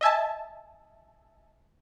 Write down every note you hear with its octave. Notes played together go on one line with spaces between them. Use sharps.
D#5 E5 G#5 A5